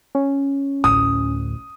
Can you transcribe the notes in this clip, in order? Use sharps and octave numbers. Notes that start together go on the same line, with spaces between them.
C#4
A1 D2 D#6